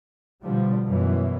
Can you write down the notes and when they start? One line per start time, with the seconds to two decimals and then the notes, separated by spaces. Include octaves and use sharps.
0.42 B2 D3 F3 G3
0.84 F#2 B2 E3